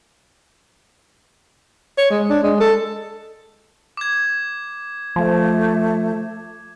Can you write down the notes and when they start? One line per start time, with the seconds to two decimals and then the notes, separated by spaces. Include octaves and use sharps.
1.98 C#5
2.10 G#3
2.29 D4
2.43 G#3
2.60 A4
3.97 D6 G#6
5.16 F3 A3